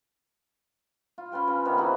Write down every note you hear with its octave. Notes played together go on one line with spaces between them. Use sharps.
F4
C#4 F4 B4 G5
C#3
C3 D#3 B3 D4
D#4 E4 F#4 G#4